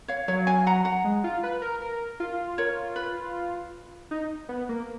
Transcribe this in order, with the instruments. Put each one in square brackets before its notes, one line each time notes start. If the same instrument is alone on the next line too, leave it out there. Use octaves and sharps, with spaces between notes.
[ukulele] C#5 F5
[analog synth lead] F#3 [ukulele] C#5 F5
[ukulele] F5 G#5
F#5 A#5
F#5 A#5
[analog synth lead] G#3
F4
B4
A#4
A#4
F4
[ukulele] A#4 C#5
B4
[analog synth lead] D#4
B3
A#3